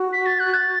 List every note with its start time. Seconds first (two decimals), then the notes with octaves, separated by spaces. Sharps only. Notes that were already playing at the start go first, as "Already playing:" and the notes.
Already playing: F#4
0.13 B6
0.26 A6
0.40 F#6
0.54 A6